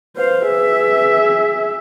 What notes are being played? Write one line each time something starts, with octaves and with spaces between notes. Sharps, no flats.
B4 C5 F5
G#4 E5